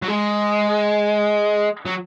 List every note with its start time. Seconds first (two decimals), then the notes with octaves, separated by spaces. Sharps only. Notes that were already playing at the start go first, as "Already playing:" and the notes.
0.02 F#3
0.08 G#3
1.86 F#3